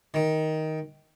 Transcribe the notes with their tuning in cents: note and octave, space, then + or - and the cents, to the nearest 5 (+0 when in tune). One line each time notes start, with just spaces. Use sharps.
D#3 +10